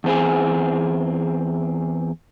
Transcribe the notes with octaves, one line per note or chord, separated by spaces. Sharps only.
E2 C4 G#4